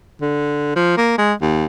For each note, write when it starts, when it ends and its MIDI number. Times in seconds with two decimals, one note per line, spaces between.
0.21 0.76 50
0.76 0.94 53
0.97 1.17 58
1.18 1.33 56
1.41 1.65 39